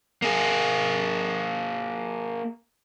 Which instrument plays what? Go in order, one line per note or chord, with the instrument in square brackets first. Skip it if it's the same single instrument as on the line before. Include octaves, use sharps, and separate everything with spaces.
[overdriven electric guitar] A#3 G#4